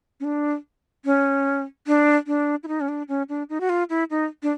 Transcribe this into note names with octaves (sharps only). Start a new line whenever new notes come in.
C#4
D4
C#4
D4
D4
E4
D#4
C#4
D4
C#4
D4
D#4
F#4
F4
E4
D#4
D4